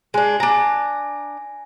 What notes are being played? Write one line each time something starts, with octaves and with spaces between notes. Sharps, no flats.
G#3 D4
D4 G#5 A#5 A#6